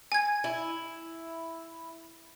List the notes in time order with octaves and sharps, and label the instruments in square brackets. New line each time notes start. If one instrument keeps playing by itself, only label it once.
[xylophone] G#5 G#6
[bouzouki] E4